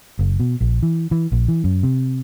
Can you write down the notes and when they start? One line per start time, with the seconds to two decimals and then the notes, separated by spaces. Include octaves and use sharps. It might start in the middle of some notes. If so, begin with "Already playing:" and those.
0.19 F#1
0.40 B2
0.61 A#1
0.83 E3
1.11 E3
1.32 A#1
1.48 E3
1.64 F#2
1.83 C3